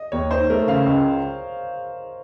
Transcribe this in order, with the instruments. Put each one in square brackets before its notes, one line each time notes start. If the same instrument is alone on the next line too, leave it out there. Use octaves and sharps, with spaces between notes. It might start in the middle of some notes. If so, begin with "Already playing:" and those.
Already playing: [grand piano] D#5
[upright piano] D#2 [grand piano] C#5
[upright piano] D#4 [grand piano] C5
[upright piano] A3 [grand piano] A#4
[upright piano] C#3 [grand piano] F5
[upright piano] C#2